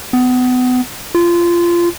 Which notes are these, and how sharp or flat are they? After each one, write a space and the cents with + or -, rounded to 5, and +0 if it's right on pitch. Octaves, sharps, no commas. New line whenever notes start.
B3 +30
F4 -20